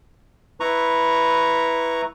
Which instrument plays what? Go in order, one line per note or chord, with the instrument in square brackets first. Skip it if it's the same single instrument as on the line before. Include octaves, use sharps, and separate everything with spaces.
[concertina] E4 B4 A#5 C#6